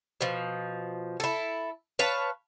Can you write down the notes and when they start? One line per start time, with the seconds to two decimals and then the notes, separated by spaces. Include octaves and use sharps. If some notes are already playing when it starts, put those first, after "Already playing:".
0.21 B2 F3
1.20 E4 A4
1.99 B4 C#5 F5 A5